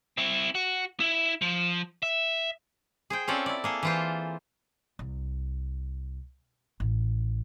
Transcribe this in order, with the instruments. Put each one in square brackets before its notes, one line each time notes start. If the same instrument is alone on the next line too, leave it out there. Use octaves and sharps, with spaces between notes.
[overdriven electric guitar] C4 E4
F#4
E4 E5
F3
E5
[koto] G#4 C5 G5
C4 C#4 F4 A4 C#5 D5
E4 D5
A#3 G#4 A4
E3 F4 C5
[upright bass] C2
A1